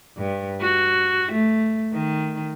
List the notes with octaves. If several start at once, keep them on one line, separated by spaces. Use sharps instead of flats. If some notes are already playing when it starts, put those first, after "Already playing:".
G2
F#4
A3
D#3